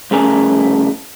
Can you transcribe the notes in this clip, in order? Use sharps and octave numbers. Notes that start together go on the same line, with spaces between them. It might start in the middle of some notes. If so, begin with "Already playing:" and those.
C2 F2 C#3 A3 A#4 G#5